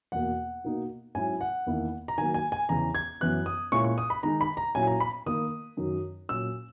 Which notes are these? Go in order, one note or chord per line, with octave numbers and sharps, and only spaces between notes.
E2 B2 A#3 F#5
B2 A#3 D#4
G#2 F#3 C#4 E4 G#5
F#5
E2 D#3 A#3 E4
A#5
D#3 F#3 A#3 G#5
G#5
G#5
E2 C#3 E3 A#5
G#6
F#2 E3 B3 E4 F#6
D#6
A#2 G#3 C#4 E4 C#6
C#6
D#6
B5
D#3 G#3 D#4 A#5
B5
A#5
A#2 F#3 C#4 E4 G#5
A#5
B5
D#3 A#3 D#4 D#6
F#2 D#3 F#3
A#2 F#3 C#4 E6